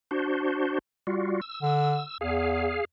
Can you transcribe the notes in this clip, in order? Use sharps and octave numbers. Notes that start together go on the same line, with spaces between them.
D4 F#4 C5
G3 F4 F#4
E6
D3
E2 G#4 F5